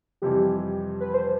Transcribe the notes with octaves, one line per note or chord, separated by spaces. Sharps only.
F2 C3 E3 G3 G4
B4
C5